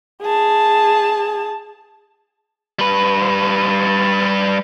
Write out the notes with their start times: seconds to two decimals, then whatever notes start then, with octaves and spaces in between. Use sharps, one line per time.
0.22 G#4 A5
2.79 G3 B4